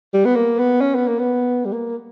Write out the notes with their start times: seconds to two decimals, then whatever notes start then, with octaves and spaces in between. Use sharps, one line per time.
0.14 G3
0.25 B3
0.36 A#3
0.59 B3
0.81 C#4
0.95 B3
1.08 A#3
1.19 B3
1.65 G3
1.72 A#3